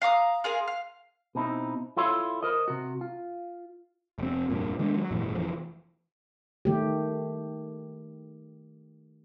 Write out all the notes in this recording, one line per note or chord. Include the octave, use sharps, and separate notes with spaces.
F5 A#5 D6 D#6
F4 G#4 A#4 F5
F5
B2 C4 D#4 E4
E4 F4 A4 C#5 F5
A#4 C5 D#5
C3 F#4
F4
F1 C4
F1 G2 A#2
D#3 G#3 D4
F#3
G#1 F#2 A#2 E3
F1 E3 F3
D#3 A3 G4